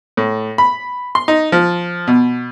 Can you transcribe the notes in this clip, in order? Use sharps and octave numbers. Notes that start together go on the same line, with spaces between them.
A2
B5
C6
D#4
F3
B2